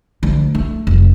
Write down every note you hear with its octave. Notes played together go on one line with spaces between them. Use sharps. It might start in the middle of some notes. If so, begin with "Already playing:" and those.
D2
A3
F1